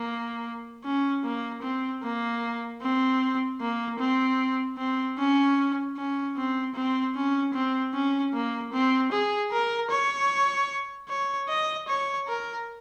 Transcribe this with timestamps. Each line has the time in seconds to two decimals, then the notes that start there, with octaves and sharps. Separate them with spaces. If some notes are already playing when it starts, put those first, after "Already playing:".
Already playing: A#3
0.85 C#4
1.24 A#3
1.63 C4
2.03 A#3
2.82 C4
3.61 A#3
3.99 C4
4.78 C4
5.18 C#4
5.97 C#4
6.37 C4
6.76 C4
7.15 C#4
7.54 C4
7.94 C#4
8.34 A#3
8.73 C4
9.12 G#4
9.52 A#4
9.91 C#5
11.09 C#5
11.49 D#5
11.88 C#5
12.28 A#4